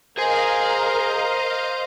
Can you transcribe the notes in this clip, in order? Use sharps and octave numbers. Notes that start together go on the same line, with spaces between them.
G#4 A#4 C5 D#5 F5 G#5